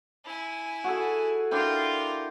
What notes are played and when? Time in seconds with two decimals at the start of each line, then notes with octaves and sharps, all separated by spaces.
0.25 E4 G#5
0.84 F#4 G#4 A4
1.51 D4 E4 F4 A#4 G5